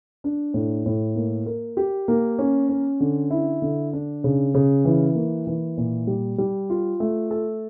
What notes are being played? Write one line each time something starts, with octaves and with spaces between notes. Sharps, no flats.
D4
A2
A2
A#3
A#4
G4
A#3
C#4
C#4
D3
E4
D3
D4
C#3
C#3
E3
A#3
E3
A#2
G3
G3
F4
A3
A4